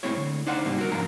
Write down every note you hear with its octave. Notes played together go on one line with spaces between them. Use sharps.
B1 A2 G#3 C4 E4 C#5
D2
D4 D#4 C5 F5 F#5
G#2 C3 G3 A#3
F#4 A#4
F2 G#2 A#3 D4 A#5